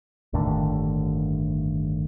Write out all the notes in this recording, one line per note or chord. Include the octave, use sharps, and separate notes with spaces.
G1 D#2 A2 D3